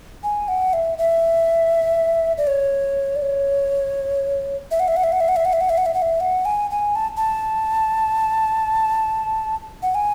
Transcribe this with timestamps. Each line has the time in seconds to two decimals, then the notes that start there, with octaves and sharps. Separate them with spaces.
0.23 G#5
0.48 F#5
0.73 E5
0.98 E5
2.38 D5
2.47 C#5
3.16 D5
3.22 C#5
4.71 E5
4.80 F#5
4.88 E5
4.96 F#5
5.04 E5
5.12 F#5
5.20 E5
5.28 F#5
5.36 E5
5.45 F#5
5.53 E5
5.61 F#5
5.69 E5
5.78 F#5
5.86 E5
5.94 F#5
6.02 E5
6.20 F#5
6.45 G#5
6.71 G#5
6.95 A5
7.17 A5
9.83 F#5
9.95 G#5